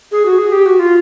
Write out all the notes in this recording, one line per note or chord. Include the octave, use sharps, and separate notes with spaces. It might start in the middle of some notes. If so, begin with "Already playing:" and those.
G#4
F#4
G#4
G4
F#4
F4